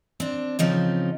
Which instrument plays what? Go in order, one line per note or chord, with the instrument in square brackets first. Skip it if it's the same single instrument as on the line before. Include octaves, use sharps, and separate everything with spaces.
[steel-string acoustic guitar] C4 D4
C#3 F3 C4 D#4